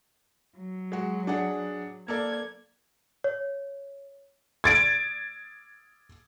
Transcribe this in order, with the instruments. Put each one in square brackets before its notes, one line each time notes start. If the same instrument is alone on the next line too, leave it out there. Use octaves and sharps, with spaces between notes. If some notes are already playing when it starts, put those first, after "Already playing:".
[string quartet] F#3
[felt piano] G#3 F#4
D4 G#4 F#5
[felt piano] A#3 A4 D5 [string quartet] G#6
[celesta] C#5
[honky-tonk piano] G#6 A6 D7